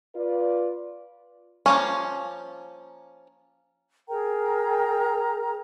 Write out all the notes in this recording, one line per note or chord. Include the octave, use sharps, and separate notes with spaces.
F4 B4 D5
F3 A#3 C#4
G#4 A#4 G5 A#5